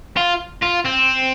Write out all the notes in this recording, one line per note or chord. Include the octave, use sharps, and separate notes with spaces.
F4
F4
C4